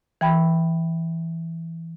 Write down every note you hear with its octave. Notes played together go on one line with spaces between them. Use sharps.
E3 G5 B5